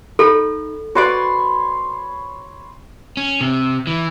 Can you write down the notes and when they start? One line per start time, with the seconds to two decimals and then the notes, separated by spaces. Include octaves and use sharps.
0.19 D#4 A4 B5
0.95 F#4 B4 C#5 D5 B5 C6
3.17 C#4
3.41 C3
3.87 E3